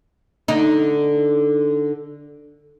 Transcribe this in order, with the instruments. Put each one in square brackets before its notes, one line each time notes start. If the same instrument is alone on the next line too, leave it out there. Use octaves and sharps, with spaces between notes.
[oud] D3 D#4